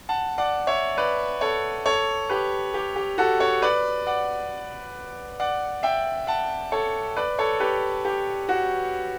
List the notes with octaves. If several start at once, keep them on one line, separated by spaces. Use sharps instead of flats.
F#5 A5
D5 F#5
C#5 E5
B4 D5
A4 C#5
A4 C#5
G4 B4
G4
G4
F#4 A4
A4 C#5
B4 D5
D5 F#5
D5 F#5
E5 G5
F#5 A5
A4 C#5
B4 D5
A4 C#5
G4 B4
G4
F#4